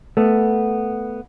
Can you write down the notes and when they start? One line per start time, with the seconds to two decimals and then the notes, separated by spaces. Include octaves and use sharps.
0.17 A3 B3